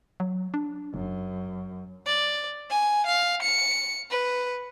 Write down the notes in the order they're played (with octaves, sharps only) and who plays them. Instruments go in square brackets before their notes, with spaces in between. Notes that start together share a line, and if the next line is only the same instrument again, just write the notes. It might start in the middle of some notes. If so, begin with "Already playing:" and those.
[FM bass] F#3
D4
[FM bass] F#1 [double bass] F#2
[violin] D5
G#5
F5
C#7
B4